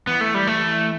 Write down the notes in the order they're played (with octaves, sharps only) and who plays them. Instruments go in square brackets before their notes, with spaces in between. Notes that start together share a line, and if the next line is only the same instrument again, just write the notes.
[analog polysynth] E3 [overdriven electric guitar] B3
[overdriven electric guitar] A3
G3
A3